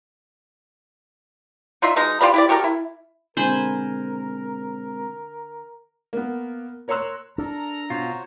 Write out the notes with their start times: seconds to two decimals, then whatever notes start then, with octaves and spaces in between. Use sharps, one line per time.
1.82 D#4 F4 D5 E5
1.96 B2 G#3 D#4
2.21 F4 G4 D5 B5
2.34 E4 G4 D5
2.49 F#4 G4 A4 A#4
2.64 E4
3.37 B2 D3 G#3 C4 A#4 C5 G#5 B5
6.13 A#3 B3
6.88 A#4 C#5 A#5 C6 E6 F#6
7.38 D4 A4 A#4 A#5
7.90 B2 F4 F#4 C5 C#5